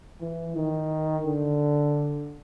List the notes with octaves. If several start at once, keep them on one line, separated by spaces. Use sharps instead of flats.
E3
D#3
D3